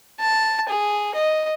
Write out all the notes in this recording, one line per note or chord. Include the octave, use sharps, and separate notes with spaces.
A5
G#4
D#5